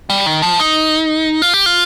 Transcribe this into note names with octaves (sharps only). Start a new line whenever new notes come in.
G3
D#3
F3
D#4
F4
G4
F4